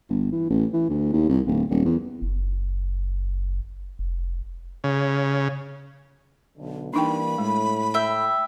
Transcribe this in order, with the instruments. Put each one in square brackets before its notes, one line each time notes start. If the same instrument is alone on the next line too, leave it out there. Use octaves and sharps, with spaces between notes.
[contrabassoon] G1
E3
A1
E3
D2
D#2
C2
D1
D#1
E2
[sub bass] F#1
F1
[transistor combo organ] C#3
[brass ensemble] B1 D3
[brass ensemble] E3 G3 A#3 [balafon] D4 D#4 G5 [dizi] B5
[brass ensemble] A2 [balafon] G#3
[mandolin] E5 G5